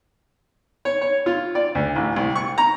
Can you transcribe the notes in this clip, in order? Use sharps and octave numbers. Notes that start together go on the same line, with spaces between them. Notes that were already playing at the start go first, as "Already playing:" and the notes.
C#5
C#5
F4
D5
D2
A1
C2
C#6
A#5